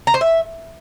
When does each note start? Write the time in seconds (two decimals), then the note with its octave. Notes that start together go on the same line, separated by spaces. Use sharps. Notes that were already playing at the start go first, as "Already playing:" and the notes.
0.07 A#5
0.14 C5
0.21 E5